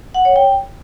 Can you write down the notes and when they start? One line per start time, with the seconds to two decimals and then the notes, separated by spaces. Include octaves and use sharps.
0.14 F#5
0.25 C#5
0.36 G5